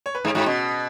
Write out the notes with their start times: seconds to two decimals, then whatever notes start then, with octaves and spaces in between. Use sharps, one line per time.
0.06 C#5
0.15 B4
0.25 G#2 G#4
0.35 G#2 F#4
0.46 B2 C#4